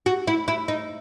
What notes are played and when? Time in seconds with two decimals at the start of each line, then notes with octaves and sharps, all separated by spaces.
0.06 F#4
0.27 E4
0.48 E4
0.68 D#4